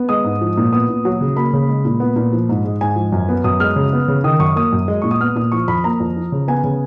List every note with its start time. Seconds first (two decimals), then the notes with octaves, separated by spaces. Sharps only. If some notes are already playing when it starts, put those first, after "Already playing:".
Already playing: B3
0.09 G#3 D#6
0.24 G#2
0.41 F3
0.57 A#2
0.73 B3 D#6
0.89 A#2
1.05 F#3
1.21 C#3
1.36 A#3 B5
1.53 C#3
1.69 G#3
1.85 A#2
2.00 B3
2.16 A#2
2.33 F3
2.49 G#2
2.65 G#3
2.81 G#2 G#5
2.96 F3
3.12 F#2
3.29 B3
3.44 F#2 D#6
3.60 G#3 F6
3.76 C#3
3.93 B3
4.08 C#3
4.24 D#3 D#6
4.40 F#2 C#6
4.56 A#3 D#6
4.72 F#2
4.88 G#3
5.02 A#2 C#6
5.11 D#6
5.20 B3 F6
5.36 A#2 D#6
5.52 F3 C#6
5.68 F2 B5
5.84 A#3 A#5
6.00 F2
6.17 F3
6.32 C#3
6.48 B3 G#5
6.64 C#3